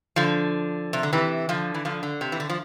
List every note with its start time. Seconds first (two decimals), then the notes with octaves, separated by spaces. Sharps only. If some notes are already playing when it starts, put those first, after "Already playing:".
0.16 D3 F3
0.93 C3
1.03 D3
1.13 C3 E3
1.49 D3 F3
1.74 E3
1.85 D3 F3
2.03 D3
2.21 C3
2.32 E3
2.40 D3
2.49 F3